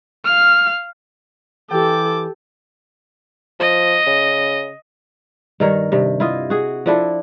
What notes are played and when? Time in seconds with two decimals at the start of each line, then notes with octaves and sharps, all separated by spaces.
0.25 F5 F6
1.71 E3 G4 A4 G5 D6
3.60 F3 D#5
4.07 C#3
5.60 G2 D#3 A#4 C#5
5.92 G2 C3
6.20 E4 F4 D#5
6.50 F#4 G#4
6.86 F3 D4 E4 A4